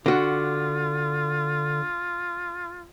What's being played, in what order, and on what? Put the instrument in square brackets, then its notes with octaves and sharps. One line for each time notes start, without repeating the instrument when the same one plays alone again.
[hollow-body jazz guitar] D3 F#4 [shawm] F4